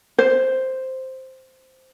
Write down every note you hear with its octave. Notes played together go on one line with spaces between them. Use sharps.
C5